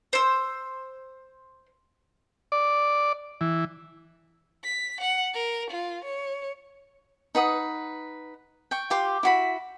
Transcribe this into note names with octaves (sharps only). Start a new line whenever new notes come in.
C5 E6
D5
E3
B6
F#5
A#4
F4
C#5
D#4 B4 F#5 D#6
G5 C#6
F4 G4 C6
E4 F#4 B5